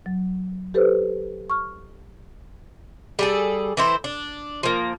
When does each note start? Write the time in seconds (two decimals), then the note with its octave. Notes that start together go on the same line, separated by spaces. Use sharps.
0.06 F#3
0.74 G4 A4 B4 C5
1.50 C#6 F6
3.19 G3 G#4 A4
3.77 E3 E4 C5
4.04 D4
4.63 F3 A#3